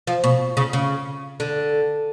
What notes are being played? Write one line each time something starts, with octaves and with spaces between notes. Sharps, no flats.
F3
B2
C#3
C#3
D3